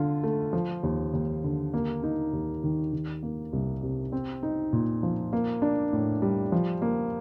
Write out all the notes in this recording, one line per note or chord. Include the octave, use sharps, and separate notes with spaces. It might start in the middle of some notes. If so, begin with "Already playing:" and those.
Already playing: D3 F4
A3
F3
D#2
D#2
D3
A#3
D#4
D#2
D#3
D#3
A#3
C2
C3
C4
D#4
A#2
F3
A#3
D4
A2
G3
F3
A#3